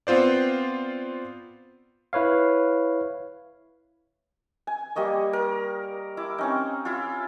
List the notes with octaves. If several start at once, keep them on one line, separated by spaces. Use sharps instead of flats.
B3 C4 F4 C5 D5
E4 B4 C#5 F5
G#5
G3 A#3 D#5 C#6
A#4
E4 D6
C4 C#4 D#4
E4 F4